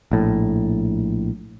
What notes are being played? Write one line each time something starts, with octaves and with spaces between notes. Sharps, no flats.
A#1 A2